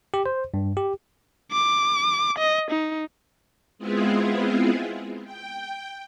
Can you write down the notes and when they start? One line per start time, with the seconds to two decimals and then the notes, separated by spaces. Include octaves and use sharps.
0.14 G4
0.26 C5
0.54 G2
0.77 G4
1.52 D6
2.39 D#5
2.71 D#4
3.78 G#3 B3 C4 E4 F4 G#4
5.24 G5